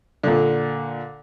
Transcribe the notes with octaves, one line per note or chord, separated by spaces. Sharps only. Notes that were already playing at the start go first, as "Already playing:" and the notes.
A#2 D3